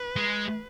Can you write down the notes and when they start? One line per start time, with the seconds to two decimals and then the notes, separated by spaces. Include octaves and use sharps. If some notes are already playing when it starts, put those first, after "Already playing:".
Already playing: B4
0.16 G#3